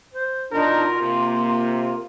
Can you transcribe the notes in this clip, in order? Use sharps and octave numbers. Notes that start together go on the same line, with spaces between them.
C5
B2 D4 D#4 F4 A#4
C3 A#3
F4